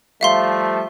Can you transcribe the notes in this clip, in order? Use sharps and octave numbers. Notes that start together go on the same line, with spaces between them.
F3 G3 A3 E5 F5 C6